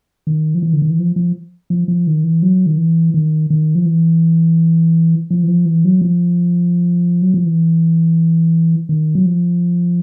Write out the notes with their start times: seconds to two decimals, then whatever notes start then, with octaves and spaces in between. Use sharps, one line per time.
0.27 D#3
0.55 F3
0.63 E3
0.73 D3
0.82 D#3
0.90 E3
0.99 F3
1.16 F3
1.70 F3
1.88 F3
2.07 D#3
2.24 E3
2.42 F#3
2.66 D#3
2.78 E3
3.14 D#3
3.50 D#3
3.75 F3
3.86 E3
5.31 F3
5.43 E3
5.47 F3
5.66 E3
5.85 F#3
6.01 F3
7.22 F#3
7.34 F3
7.46 E3
8.89 D#3
9.15 F#3
9.26 F3